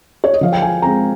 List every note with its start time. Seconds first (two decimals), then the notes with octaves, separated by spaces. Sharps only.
0.24 C#5
0.33 D#5
0.41 F3 F5
0.52 G5
0.62 G#5
0.82 G#3 C4 A#5